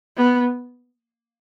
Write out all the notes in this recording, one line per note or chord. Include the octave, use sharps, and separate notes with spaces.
B3